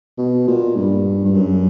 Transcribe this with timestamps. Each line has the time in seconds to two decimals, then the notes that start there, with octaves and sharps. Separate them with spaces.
0.18 B2
0.47 A#2
0.76 G2
1.25 G2
1.35 F#2